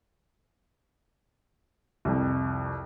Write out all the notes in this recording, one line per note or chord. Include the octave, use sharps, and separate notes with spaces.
C2 F2